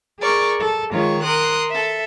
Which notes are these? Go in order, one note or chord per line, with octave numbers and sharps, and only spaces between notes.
G#4 A#4 D5 C#6
A4
D#3 G#3 F4 C#5 C#6
A#4 C6 D#6 F#6
A4 E5